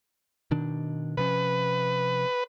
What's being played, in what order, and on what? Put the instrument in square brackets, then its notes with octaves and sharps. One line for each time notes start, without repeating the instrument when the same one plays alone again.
[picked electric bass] B2 D#3 D4
[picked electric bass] C3 F3 C#4 [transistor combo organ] B4